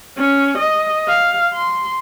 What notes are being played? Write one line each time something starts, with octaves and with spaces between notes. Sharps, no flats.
C#4
D#5
F5
C6